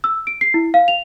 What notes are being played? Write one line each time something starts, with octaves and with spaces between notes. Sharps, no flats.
E6
D7
C7
E4
F5
F7